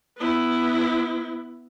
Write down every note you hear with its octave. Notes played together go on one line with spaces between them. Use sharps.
B3 E4